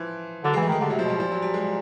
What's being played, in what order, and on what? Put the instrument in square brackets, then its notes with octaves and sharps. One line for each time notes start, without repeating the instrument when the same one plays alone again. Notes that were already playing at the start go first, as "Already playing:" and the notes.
Already playing: [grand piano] E3 F3
[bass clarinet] D3 [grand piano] F#3
[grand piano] G#3
[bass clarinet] E3
[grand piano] A3
[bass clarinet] D#3
[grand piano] G#3
[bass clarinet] D3 [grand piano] G3
[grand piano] F#3
[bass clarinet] C3
[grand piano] F3
[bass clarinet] B2 [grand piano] G3
[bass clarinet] A#2 [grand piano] F3
[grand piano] F#3
G3
G#3